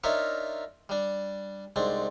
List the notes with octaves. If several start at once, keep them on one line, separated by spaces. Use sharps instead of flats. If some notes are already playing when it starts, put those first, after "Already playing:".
D4 D#4 F4 A#4 C#5 E5
G3 D4
C2 G#2 C4 D4